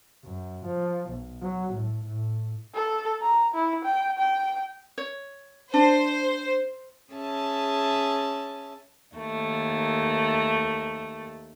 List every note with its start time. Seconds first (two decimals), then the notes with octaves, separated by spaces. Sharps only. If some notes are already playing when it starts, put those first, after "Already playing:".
0.24 F#2
0.66 F3
1.10 B1
1.42 F#3
1.74 A2
2.05 A2
2.75 A4
3.22 A#5
3.55 E4
3.85 G5
4.18 G5
4.98 C#5
5.74 D4 C5
7.12 C#4 G#4 E5 A5
9.15 D#2 A3